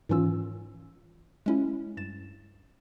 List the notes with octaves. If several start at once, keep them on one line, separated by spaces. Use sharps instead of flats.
G#2 D#3 E3 C#4 F4 E6
G#3 C#4 E4
G2 A6 E7